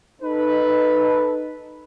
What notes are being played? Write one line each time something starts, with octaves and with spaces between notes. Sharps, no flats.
D#4 A4 B4